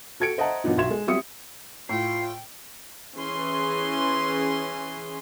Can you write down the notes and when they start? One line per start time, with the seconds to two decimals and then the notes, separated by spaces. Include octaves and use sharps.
0.20 F#4 A4 G#6 C#7 D7
0.38 C5 D#5 E5 F#5 A5 A#5
0.64 A#2 F#3 B3 D4 D#4
0.77 B1 F#4 E5 C6 G#6 E7
0.90 G#3
1.07 F#3 G3 C4 E5 D#6 C#7
1.89 A2 F4 G5 C7
3.17 E3 C#4 G#4 C6